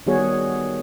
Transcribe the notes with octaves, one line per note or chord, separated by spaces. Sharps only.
D#3 G3 B3 F#4 G#4 C#5